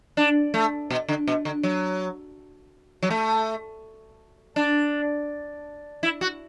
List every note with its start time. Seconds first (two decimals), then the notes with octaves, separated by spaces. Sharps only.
0.17 D4
0.54 A3
0.90 B2
1.08 D3
1.27 B2
1.45 D3
1.63 F#3
3.03 F#3
3.10 A3
4.56 D4
6.03 E4
6.21 F#4